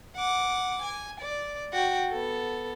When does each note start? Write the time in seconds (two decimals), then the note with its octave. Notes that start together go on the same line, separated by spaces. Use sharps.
0.16 F#5 D6
0.83 G#5
1.21 D5
1.73 F#4 G5
2.11 B3 A4